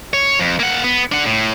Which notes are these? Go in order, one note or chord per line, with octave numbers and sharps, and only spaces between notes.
C#5
F2
A#3 F#5
B3
D4 F#5
A2